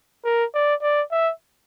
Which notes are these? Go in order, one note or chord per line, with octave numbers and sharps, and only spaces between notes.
A#4
D5
D5
E5